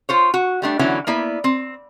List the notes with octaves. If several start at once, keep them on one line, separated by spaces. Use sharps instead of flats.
F4 C5 C#5
F#4
G3 A3 D4
D3 E3 F#3 B3 C#4 E4
A#3 B3 E4 D5
C4